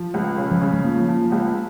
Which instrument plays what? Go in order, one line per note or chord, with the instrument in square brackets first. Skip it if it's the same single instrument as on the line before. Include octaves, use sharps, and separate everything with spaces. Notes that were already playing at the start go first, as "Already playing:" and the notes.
Already playing: [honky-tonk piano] F3
C#2
C#3
[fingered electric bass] F3
[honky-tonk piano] C#3 [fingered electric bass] G3
[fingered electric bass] G#3
[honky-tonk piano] F3 [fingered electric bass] A#3
[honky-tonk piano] F3
C#2